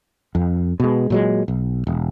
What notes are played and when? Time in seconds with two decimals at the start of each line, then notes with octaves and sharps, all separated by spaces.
0.35 F2
0.80 B2 G#3
1.10 A#2 F#3 G#3
1.48 B1
1.87 E1